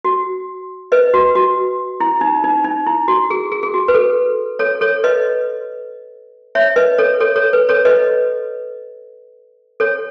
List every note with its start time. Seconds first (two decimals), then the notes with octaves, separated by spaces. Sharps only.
0.05 F#4
0.92 B4 D#5
1.14 F#4
1.35 F#4
2.00 E4
2.21 D#4
2.44 D#4
2.64 D#4
2.86 E4
3.08 F#4
3.30 G#4
3.52 G#4
3.63 G#4
3.74 F#4
3.88 B4
3.94 A4
4.59 A4 C#5
4.81 A4 C#5
5.04 B4 D#5
6.55 C#5 E5
6.76 B4 D#5
6.98 A4 C#5
7.20 A4 C#5
7.36 A4 C#5
7.53 B4
7.69 A4 C#5
7.85 B4 D#5
9.80 A4 C#5